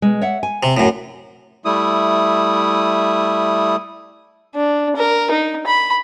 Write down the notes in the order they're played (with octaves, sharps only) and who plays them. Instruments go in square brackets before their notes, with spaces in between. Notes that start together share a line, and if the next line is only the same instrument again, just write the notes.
[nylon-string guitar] B2 G#3
C#5 E5 F#5
G#5
[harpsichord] C3
F#2 A2
[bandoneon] G3 A3 E4 D#6
[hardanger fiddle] D4
A#4
D#4
B5